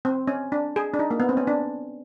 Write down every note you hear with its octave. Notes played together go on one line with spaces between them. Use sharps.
C4
C#4
D4
G#4
D4
D#4
A#3
B3
C4
C#4
D4